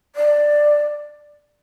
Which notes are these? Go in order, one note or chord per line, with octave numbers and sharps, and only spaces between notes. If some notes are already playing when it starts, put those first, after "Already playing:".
D5